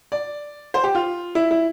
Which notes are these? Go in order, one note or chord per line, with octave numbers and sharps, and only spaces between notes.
D5
C5
G4
F4
E4
E4